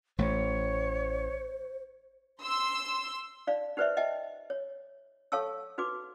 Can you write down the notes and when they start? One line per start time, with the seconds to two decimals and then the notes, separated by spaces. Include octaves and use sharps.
0.18 A1 A3 C5 C#5
2.42 C6 E6
3.47 D#4 D5 F5
3.77 D#4 G4 B4 C5 D5 E5
3.97 D#5 E5 G5 A5
4.50 C#5
5.32 A4 C#5 F5 A5 C#6 E6
5.78 D#4 F#4 B4 D6